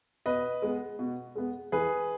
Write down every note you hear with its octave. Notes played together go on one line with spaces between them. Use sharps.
B2 B4 D#5
G#3 B3
B2
G#3 B3
E3 G#4 B4